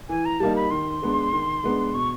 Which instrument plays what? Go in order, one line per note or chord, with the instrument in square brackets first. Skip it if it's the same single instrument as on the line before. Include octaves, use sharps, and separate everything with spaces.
[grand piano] E3 [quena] G#5
[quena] A#5
[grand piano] G3 A#3 D#4 [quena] A5
[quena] B5
[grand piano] D#3 [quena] C6
[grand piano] G#3 B3 D4
D#3
G#3 B3 D4
[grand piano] B2 [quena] C#6